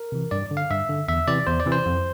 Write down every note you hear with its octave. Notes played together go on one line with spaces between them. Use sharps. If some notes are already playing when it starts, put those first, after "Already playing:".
Already playing: A#4
C3 E3
G2 D5
D3
F5
G2 E5
D3
E2 E5
C3 E3 D5
E2 C5
D5
C3 E3
C5
F2